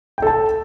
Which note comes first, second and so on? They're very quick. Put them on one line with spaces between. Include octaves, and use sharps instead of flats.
G5 A4 A5